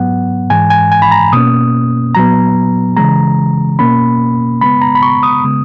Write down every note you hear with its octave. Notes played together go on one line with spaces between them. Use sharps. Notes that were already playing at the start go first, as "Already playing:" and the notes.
Already playing: G#2 F#3 B3 F#5
G#2 E3 G#3 G#5
G#5
G#5
B5
A#5
B2 A#3 C#4 D#6
A#2 F#3 B3 A#5
C#3 E3 G#3 A#5
B2 A#3 C#4 B5
C#3 G#3 B3 B5
A#5
B5
C#6
D#6
C#3 G#3 B3